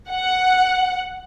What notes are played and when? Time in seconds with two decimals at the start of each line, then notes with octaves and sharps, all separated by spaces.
0.10 F#5